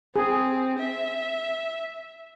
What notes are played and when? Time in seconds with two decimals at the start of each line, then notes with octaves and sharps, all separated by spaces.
0.16 C4 G#4
0.79 E5